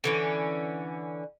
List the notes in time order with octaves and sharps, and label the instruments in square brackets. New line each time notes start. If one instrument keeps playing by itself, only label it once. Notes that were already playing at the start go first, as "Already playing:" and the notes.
[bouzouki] D3 E3 C#4